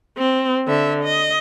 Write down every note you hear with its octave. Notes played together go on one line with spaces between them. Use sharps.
C4
D3 E5
D#5